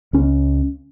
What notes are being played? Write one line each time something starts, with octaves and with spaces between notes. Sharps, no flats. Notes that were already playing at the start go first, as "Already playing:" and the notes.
C#2 C#4